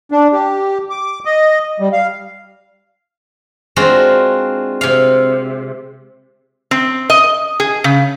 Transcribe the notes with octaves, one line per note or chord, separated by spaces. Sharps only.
D4
G4
D6
D#5
G3
F5
G#3 C4 D4 F4 F#4
C3 F5
C4
D#5
G#4
C#3